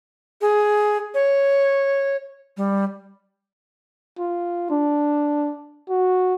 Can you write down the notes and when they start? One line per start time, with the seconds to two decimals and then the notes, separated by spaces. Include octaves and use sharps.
0.41 G#4
1.14 C#5
2.57 G3
4.19 F4
4.70 D4
5.90 F#4